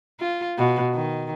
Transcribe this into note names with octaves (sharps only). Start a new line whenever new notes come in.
F4
B2
D#3